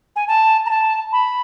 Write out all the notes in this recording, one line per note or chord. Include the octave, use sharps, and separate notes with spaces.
G#5
A5
A#5
A5
B5